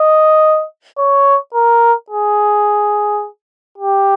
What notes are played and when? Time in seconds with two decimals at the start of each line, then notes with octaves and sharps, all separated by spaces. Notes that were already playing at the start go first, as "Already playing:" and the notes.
Already playing: D#5
0.98 C#5
1.55 A#4
2.10 G#4
3.78 G4